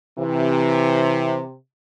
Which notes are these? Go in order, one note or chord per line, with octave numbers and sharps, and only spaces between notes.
C3 E3